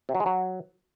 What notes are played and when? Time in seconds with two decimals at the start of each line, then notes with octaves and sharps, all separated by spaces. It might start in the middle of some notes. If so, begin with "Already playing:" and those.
0.09 C3
0.15 F#3
0.20 G#3
0.26 F#3